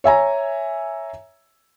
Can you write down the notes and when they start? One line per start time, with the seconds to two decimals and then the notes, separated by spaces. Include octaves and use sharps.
0.04 C#5 E5 G#5 A#5